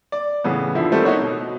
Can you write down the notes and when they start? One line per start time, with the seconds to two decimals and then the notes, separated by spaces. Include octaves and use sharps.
0.12 D5
0.44 A2 C#3 E3 B3
0.75 D3 F3 E4
0.92 D#3 G3 A3 C4
1.05 B3 D#4 E4 F#4 C#5
1.22 B2